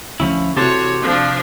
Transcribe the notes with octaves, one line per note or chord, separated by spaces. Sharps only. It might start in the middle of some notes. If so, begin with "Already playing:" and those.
D2 F3 C#4 E4
C3 E3 F#4 G4 A4 C5 C#5
C3 F3 D4